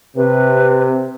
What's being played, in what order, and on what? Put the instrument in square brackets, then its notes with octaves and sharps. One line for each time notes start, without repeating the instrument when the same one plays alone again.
[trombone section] C3 [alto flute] B4